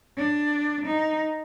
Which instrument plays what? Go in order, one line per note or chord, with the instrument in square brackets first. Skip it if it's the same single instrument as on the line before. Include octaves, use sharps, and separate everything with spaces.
[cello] D4
D#4